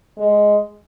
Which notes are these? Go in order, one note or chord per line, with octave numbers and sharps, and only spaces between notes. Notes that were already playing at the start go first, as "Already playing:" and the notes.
G#3